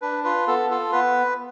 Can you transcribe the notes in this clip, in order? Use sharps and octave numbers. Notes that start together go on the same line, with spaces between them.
D4 B4
F4 B4
B3 A4
F4 A4
B3 B4